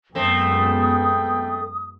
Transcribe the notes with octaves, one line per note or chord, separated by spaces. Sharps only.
F#2 G#3 A3 B3 C4 G5 D#6